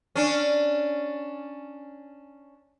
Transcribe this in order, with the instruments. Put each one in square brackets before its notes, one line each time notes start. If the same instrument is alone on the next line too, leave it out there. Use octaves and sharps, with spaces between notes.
[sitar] C#4 D4